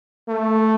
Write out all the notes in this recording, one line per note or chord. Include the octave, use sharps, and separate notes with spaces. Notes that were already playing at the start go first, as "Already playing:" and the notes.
A3